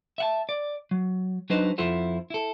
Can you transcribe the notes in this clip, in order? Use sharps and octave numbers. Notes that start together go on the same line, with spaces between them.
E5 F#5 A5
D5
F#3
F#3 D4 D#4 B4 C5 D#5
F2 E4 F4 A4 C5 F#5
E4 A4